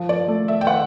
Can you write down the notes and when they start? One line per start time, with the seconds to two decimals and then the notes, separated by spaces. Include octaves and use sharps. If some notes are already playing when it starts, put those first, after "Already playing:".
Already playing: F3
0.09 D5
0.28 A3
0.48 E5
0.61 G5
0.67 F#5